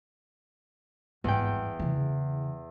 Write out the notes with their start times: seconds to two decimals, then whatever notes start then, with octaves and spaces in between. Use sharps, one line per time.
1.24 G#1 E2 G2 G5
1.79 C#3 E3